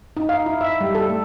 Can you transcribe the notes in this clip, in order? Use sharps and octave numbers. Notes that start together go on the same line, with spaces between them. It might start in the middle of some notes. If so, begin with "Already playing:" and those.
D#4
F5
E4
E5
G3
A4
A3